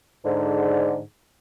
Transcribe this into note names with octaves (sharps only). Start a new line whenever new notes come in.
G#2 D3